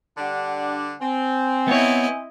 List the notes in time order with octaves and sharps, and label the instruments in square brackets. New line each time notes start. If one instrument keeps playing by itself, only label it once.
[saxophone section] D3 G3 D4 [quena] F#5
[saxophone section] C4 [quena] G#5
[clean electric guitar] B3 C#5 [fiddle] E4 D#5